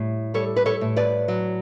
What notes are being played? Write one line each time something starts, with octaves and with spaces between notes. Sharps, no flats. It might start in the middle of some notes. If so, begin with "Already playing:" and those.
Already playing: A2 G3
G3 A4 C#5
B4
A4 C#5
A2
B4 D5
F#3